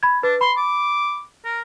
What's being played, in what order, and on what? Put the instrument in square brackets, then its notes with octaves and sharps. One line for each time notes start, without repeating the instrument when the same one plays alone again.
[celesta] B5 G#6
[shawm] D4 [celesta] B4
[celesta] B5 [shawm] C6
[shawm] D6
A#4